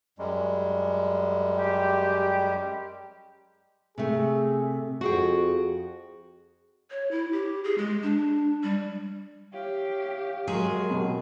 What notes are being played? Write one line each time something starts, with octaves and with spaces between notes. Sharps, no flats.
F#2 G3 G#3
G4
C3 A3 G#4
F2 F#4 G#4 G5
C#5
E4
G4
G#4
G#3
D4
G3
G4 C#5 E5 F5
F#2 D#3 F#3 G#3 G#4
B2